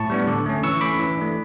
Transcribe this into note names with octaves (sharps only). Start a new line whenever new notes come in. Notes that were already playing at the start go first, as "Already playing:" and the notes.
Already playing: A2 A5 C#6
G3 B3 D4
D3
A3 C#4
E3 C#6 E6
A3 C#4 B5 D6
E3
A3 D4